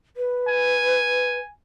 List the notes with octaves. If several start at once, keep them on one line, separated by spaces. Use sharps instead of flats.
B4
G#5